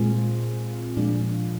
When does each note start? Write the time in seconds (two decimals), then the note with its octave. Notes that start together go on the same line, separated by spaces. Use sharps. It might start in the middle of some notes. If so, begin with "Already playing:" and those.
Already playing: A#2 G#3 C4 F4
0.97 A#2 F3 G#3 D4 F4